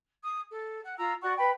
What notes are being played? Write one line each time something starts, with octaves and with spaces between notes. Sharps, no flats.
D#6
A4
F#5
F4 A#5 E6
F#4 D5 F#5 C#6
B4 G5 B5